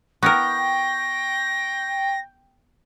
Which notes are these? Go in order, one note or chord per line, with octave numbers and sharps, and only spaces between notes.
B3 E4 A#4 G5 C#6 A#6